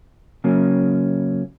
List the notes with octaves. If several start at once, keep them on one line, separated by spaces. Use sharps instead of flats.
C#3 F#3 A#3 C#4